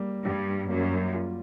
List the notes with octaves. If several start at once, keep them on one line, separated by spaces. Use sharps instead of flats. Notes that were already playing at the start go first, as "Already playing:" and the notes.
Already playing: G3 A#3
G2 G3
F#2 A#3
F4